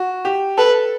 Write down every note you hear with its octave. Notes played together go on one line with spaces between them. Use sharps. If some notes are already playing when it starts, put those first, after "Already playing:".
Already playing: F#4
G4
A4 B4